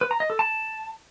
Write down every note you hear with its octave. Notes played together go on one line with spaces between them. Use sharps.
B4
A#5
D#5
A4
A5